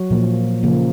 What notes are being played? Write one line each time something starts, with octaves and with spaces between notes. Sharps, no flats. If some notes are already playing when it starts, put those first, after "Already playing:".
Already playing: F#3 F#4
A#2 F3 A#3
C#3 F3 A#3